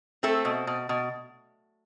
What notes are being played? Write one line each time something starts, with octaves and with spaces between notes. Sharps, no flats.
A3 C4 A4
B2
B2
B2